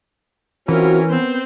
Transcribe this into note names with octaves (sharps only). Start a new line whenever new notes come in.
E3 C4 C#4 F4 F#4 A#4
B3 C4 C5